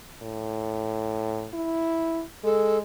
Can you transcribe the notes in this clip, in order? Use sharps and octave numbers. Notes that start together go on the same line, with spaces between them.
A2
E4
G#3 A4